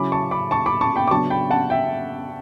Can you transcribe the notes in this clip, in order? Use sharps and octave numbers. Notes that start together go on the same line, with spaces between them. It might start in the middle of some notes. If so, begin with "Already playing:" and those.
Already playing: C#3 F#3 C#4 E4 B5 D6
A5 C#6
B5 D6
A5 C#6
B5 D6
A5 C#6
G5 B5
D6
C#3 F#3 B3 D4 A5 C#6
G5 B5
F#5 A5
E5 G5